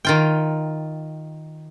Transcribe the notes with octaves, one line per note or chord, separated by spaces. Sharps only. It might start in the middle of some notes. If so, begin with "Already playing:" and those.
D#3 F4 G5